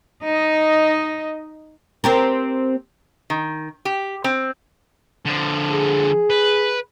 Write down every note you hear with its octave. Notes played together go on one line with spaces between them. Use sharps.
D#4 D#5
C4 G4 A#4
D#3
G4
C4
D3 F3
G#4
B4